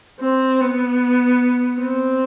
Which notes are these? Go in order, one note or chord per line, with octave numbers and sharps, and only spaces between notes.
C4
B3
C4